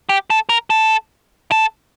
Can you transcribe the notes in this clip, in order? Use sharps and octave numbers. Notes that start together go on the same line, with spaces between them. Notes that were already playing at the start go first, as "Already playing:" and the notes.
G4
A4
A#4
A4
A4